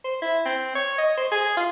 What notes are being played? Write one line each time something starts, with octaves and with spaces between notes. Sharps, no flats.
C5
E4
C4
C#5
D#5
C5
G#4
F4